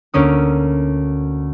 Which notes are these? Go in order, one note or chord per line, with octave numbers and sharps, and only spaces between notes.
D2 A#3 C#4 D#6